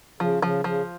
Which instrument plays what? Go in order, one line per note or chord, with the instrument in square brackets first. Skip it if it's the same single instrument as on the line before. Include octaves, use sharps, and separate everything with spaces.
[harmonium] C#3 [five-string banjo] F3
[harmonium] C#3 [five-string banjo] F3
[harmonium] C#3 [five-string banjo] F3